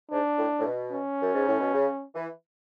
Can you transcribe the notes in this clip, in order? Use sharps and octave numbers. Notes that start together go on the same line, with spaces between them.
G#2 D4
A2
A2
B2
C#4
F#2
G#2
A2
B2
C#3
E3